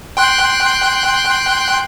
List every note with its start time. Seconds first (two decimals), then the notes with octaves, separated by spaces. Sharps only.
0.17 G5 C6 F#6